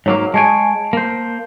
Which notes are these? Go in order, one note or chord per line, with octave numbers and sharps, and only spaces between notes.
G#2 F#3 A#3 C#5
G#3 C#5 G#5 A5 D7
A#3 C5